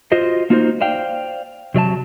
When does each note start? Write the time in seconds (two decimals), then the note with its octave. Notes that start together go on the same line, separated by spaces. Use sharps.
0.12 F4 F#4 C5 D#5
0.50 A#3 D#4 F4 F#4 A4 C5
0.81 C5 D5 F5 G5
1.74 C3 F#3 D5 A5